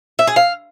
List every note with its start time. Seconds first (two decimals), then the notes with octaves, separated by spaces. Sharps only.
0.19 E5
0.27 G#4
0.36 F5